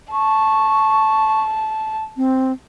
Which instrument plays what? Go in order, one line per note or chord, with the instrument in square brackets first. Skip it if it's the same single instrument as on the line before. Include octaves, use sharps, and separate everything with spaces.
[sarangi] A5 [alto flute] C#6
[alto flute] C4